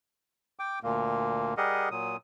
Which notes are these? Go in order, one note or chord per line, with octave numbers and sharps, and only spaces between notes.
G5 D6
D2 A#2 A#3
G3 G4 G#4 A#4 D#5 F#5
A#2 F#3 D#6